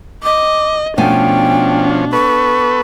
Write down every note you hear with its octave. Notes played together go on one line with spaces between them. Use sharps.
D#5 D6
B2 F3 A3 C#4 D4 G5 G#5
B3 A4 B4 C#6